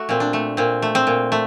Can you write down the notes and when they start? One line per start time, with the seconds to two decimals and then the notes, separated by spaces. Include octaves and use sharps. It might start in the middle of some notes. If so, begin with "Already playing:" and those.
Already playing: A3 F#4
0.09 A#2 C4
0.20 D4
0.33 A3
0.57 A#2 C4
0.82 A3
0.95 C4
1.07 A#2
1.32 A3